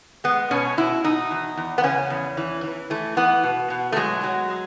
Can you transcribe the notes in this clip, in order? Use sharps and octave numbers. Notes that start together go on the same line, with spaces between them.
G#3 B3
B2 C#4
B2 E4
B2 D#4
E2
E2
B3
C#3 C#4
E2
E3
E3
E3 A3
E3 B3
B2
B2
A3
F#3 G#3
F#3
G#3